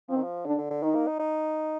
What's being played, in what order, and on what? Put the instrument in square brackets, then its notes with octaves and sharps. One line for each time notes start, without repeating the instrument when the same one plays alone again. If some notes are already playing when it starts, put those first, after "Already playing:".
[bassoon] F3 [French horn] C4
[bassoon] D#3
F3
[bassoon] D3 [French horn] D4
[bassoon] D3
D3
[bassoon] D#3 [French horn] D#4
[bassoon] A#3
D#4
D#4